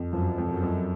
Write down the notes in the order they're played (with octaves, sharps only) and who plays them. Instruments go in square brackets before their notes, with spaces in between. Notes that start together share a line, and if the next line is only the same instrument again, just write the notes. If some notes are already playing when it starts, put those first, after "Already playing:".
Already playing: [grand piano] F2
[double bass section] F#2 [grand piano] F3
[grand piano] F2
[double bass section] F#2
[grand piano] F2